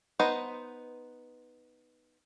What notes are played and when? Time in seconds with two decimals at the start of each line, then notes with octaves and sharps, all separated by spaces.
0.19 B3 D#4 B4 C5 D#5